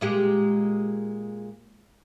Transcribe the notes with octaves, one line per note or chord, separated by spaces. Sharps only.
A#2 G#3 G4